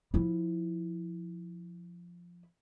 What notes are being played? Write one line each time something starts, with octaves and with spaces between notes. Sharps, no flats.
F3 E4